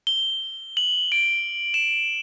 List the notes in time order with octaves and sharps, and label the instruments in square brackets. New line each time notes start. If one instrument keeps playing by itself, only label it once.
[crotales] G7
F#7
D7
E7